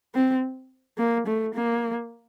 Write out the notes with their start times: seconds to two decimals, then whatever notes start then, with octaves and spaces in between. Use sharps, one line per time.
0.14 C4
0.98 A#3
1.27 A3
1.54 A#3